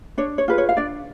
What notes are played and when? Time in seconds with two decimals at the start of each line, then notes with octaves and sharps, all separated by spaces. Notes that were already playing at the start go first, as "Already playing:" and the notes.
0.18 D4 C#5
0.38 C#5
0.48 F4 G#4 B4
0.58 C#5
0.69 F5
0.77 D4 D5